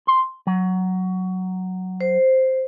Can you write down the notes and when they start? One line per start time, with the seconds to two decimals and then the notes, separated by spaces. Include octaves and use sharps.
0.07 C6
0.47 F#3
2.01 C5